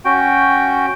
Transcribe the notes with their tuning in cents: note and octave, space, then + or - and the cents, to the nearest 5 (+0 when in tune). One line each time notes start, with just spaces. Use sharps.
C#4 +0 F#4 +0 G5 +0